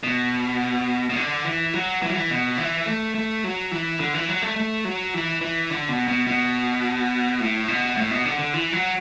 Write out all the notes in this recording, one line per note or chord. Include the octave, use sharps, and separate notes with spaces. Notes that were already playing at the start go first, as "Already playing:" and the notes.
B2
B2
D3
E3
F#3
E3
F#3
E3
B2
E3
A3
A3
F#3
E3
D3
E3
F#3
A3
A3
F#3
E3
E3
D3
B2
B2
B2
A2
B2
A2
B2
D3
D3
E3
F#3